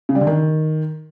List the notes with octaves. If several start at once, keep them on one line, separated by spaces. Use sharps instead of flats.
C#3
G3
D3
D#3